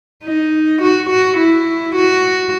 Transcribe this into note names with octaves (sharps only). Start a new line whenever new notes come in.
D#4
F#4
F#4
E4
F#4